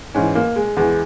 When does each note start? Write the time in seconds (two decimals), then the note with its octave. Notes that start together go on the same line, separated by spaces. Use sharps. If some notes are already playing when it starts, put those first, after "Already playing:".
0.15 G#2 E3 C#4
0.35 A#3
0.56 G#3
0.77 E2 E3 G#3